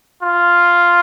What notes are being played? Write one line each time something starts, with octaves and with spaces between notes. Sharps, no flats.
F4